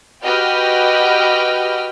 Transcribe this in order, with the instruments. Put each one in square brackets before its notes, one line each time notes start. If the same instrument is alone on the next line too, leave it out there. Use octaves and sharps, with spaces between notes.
[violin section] F#4 G4 B4 D#5 G5 F6